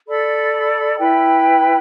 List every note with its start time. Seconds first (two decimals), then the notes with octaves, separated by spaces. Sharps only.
0.06 A4 D5 B5
0.99 E4 B4 G5 B5